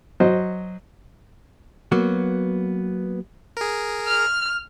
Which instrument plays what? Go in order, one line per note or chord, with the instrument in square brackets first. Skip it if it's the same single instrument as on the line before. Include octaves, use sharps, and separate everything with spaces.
[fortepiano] F#3 C5 D#5
[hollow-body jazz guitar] F#3 A#3 B3 F#4
[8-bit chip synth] G#4 A#4
[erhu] F6